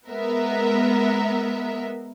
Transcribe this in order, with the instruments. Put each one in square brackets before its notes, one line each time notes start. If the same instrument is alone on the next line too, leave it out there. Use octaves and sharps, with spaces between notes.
[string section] G#3 B3 A#4 E5